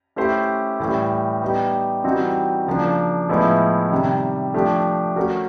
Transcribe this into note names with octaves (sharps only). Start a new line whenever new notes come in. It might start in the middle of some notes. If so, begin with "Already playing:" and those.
A3 C#4 E4 G4 C5
A2 E3 G3
G3 B3 D#4 G4
E3 G3 C4 D#4 F#4
C#3 F3 A#3 D4
A2 F3 G#3 B3 E4
C3 D#3 G3
F3 A3 D4 G4
A3 C#4 F#4 A#4